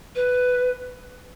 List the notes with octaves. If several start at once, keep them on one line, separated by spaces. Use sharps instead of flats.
B4